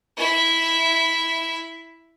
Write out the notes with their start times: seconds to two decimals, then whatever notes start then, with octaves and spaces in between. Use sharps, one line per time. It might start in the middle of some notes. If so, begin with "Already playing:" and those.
0.17 E4 E5